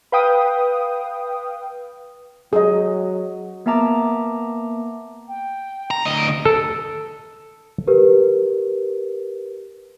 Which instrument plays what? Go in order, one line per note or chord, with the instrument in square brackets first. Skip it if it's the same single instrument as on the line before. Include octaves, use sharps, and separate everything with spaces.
[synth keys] B4 F5 G5 D#6
[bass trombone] F#3 [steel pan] G#4 D#5
[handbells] A#3 B3 E5 A5 A#5 D6
[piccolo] G5
[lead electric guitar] A#5
D2 D#5
[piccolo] D7
[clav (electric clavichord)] A4
[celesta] G4 A#4 B4